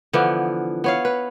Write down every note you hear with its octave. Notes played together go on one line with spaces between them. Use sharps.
D3 E3 F3 B3
B3 C#5 F5
B4